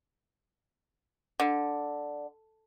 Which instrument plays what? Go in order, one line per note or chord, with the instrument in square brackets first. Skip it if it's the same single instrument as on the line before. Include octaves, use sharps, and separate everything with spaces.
[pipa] D3